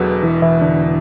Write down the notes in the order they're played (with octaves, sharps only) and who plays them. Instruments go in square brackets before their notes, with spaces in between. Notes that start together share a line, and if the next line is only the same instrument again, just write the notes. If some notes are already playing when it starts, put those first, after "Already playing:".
Already playing: [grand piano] E1 E2 B2 [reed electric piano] F#3 F#4 G#4 A4 B4
[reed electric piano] E3 E4
E3 E4
D3 D4